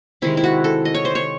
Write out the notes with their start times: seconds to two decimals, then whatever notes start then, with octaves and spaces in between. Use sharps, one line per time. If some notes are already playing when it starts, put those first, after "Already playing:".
0.22 C3 D#3 G#3 E4
0.37 E4
0.44 F#4
0.64 A4
0.85 D#5
0.94 C#5
1.05 C5
1.15 C#5